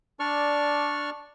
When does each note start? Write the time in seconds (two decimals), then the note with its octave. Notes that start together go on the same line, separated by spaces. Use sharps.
0.20 D4 D5 C#6 F6